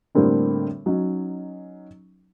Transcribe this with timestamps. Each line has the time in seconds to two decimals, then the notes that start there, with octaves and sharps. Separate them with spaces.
0.15 A2 D3 G3 A#3 C4 D4
0.86 F#3 C#4 D#4